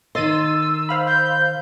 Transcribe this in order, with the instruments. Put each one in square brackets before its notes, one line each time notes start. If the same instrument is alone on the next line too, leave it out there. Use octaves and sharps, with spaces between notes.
[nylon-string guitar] D#3 D#5 [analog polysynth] C6 A6 D#7 [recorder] E6
[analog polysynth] C5 F5 B5
[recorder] G6